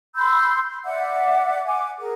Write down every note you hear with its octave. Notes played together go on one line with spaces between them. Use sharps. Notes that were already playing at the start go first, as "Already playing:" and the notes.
B5 C6 E6 G6
D5 E5 F#5 D6
F#5 G#5 D6
G#4 A#4